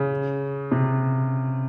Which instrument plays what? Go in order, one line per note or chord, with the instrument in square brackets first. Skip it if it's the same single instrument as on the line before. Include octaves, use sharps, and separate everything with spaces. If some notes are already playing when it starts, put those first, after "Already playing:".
Already playing: [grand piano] C#3
C3